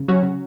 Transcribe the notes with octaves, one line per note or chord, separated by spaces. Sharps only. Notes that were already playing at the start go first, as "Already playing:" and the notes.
Already playing: C#3
F#3 C#4 F#4
C#3